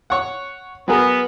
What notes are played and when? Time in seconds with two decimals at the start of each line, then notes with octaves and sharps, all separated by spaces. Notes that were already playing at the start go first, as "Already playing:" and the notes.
0.10 C#5 F#5
0.88 F#3 B3 G#4 A#4